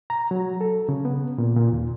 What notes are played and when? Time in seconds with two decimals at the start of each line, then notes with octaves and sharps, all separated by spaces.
0.10 A#5
0.31 F#3
0.61 A4
0.89 C#3
1.05 B3
1.38 A#2
1.56 A#2
1.72 D#2